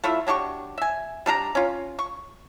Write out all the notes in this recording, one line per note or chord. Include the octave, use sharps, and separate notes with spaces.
A3 E4 F4 E5
F#3 D4 G4 C#6
E5 G#5
G3 D4 A4 A#5
C#4 F4
C#6